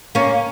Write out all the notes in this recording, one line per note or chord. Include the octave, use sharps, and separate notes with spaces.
A#3 C#4